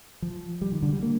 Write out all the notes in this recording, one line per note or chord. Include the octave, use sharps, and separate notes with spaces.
F3
G3
D#3
D3
G3
A#3